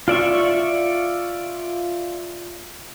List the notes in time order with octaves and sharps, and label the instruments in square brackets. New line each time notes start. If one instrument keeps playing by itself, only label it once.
[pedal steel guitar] F4 D5 E5 C#6